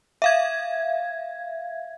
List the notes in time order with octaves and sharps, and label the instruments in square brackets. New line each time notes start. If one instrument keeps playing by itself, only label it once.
[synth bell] E5 F5 G#6